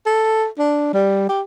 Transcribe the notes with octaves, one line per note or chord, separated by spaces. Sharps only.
A4
D4
G3
G4